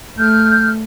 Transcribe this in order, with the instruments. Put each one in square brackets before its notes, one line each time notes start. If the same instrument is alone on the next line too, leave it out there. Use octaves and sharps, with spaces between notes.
[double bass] A3 [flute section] F6 G6